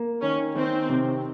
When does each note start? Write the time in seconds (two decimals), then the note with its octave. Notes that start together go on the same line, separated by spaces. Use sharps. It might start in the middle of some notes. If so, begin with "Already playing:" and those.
Already playing: A#3
0.21 D#3 C#4
0.55 D#3 C4
0.89 C3